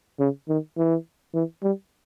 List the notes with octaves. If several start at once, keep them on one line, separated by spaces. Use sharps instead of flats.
C#3
D#3
E3
E3
G3